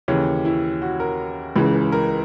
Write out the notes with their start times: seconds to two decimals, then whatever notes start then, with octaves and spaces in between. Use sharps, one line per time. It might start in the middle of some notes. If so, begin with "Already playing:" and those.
0.08 D#2 C#3 E3 C#4
0.45 E4
0.82 F#4
1.00 A#4
1.56 C#2 C#3 E3
1.92 A#4